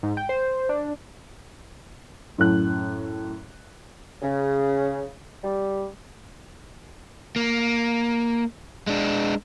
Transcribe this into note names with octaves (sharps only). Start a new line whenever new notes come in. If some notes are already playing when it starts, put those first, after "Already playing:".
G#2
G5
C5
D4
F#2 A2 F#6
C#3
G3
A#3
G#3 D4